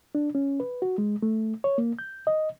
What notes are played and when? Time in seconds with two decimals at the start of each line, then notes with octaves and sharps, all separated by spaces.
0.15 D4
0.35 C#4
0.60 B4
0.82 F#4
0.98 G#3
1.22 A3
1.64 C#5
1.78 A#3
1.99 G6
2.27 D#5